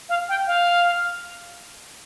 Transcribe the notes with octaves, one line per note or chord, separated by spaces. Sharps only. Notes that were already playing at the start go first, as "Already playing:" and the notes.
F5
G5
F5